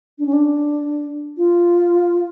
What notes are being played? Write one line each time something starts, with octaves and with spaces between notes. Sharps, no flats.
D4
C#4
D4
F4